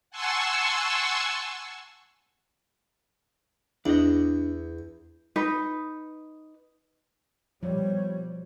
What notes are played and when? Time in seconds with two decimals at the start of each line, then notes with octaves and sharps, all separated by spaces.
0.10 F#5 G#5 A5 C6 C#6 E6
3.86 E2 D4 D#5
5.36 D#4 B4
7.63 B2 F3 G3 C#5